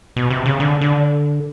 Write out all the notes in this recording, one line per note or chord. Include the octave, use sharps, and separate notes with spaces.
B2
C3
C#3
D3
D3